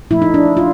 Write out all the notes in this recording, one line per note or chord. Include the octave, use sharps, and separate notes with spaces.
A#2 F3 A3 E4
D#4
D4
F4